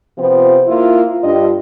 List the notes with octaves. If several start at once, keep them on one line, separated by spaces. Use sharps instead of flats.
C3 F3 B3 C4 F4
A#3 E4 F4
G2 G3 D4 F4 D#5